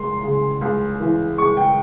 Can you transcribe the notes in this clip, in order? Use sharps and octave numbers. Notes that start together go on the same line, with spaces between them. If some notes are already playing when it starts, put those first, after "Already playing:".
Already playing: C#2 G#3 C6
C#3
C#2
E3
G#3 C#6
G5